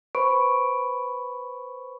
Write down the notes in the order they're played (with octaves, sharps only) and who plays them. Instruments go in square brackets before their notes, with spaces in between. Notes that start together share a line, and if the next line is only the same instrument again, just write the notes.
[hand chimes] B4 C5 B5 C#6 D7